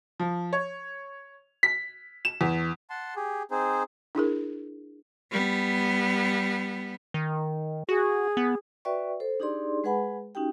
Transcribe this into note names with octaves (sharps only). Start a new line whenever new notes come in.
F3
C#5
B6
E7
E2
F#5 A5 C6
G4 G#4
C4 D#4 G#4 C5
D4 E4 G#4 A#4
G3 B3
D#3
F#4 G#4
B3
F#4 B4 D5 E5 G5 C#6
A4 C5
D4 D#4 G4 G#4 D5 C6
G#3 G#4 B4 F#5 G#5 B5
C#4 D#4 F#4 G4 G5